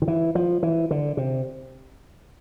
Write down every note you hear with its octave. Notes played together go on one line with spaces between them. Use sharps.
D#3
E3
F3
E3
D3
C3